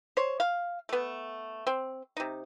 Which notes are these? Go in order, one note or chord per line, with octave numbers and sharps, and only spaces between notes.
C5 C#5
F5
A3 B3
C4
C3 D#4